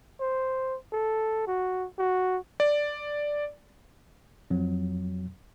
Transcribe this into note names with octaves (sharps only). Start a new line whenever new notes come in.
C5
A4
F#4
F#4
D5
F2 F#3